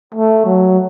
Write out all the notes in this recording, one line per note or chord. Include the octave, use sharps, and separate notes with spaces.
A3
F#3